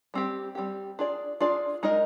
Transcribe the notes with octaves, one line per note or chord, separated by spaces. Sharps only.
G3 C4 G4
G3 C4 G4
D4 F4 G#4 D5
D4 F4 G#4 D5
G#3 D#4 A#4 D#5